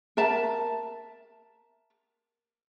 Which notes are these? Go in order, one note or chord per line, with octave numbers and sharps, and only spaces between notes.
A#4 E5 A5 A#5